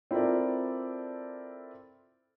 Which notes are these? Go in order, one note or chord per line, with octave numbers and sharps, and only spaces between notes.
C4 E4 F4 A4 A#4 D5